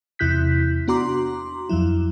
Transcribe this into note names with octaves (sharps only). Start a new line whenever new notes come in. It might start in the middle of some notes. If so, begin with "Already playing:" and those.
E2 C3 E4 F#6 G6 B6
B3 D4 F#4 A#5 C6 D6
F2 F3 F#3 E4